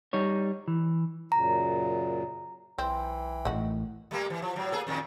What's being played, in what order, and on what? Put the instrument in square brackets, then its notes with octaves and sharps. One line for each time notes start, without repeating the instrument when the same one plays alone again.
[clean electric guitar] G3 D#4 C#5
E3
[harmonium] F#2 A#2 C#3 [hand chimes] A#5
[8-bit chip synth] B1 G5 [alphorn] E3 [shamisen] C4
[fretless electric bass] A1 A2 [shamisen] D#3 F#4
[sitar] G3 A3 A#3
E3
F3
A2 F#3
A#3 G#4 A4
F2 A#2 D#3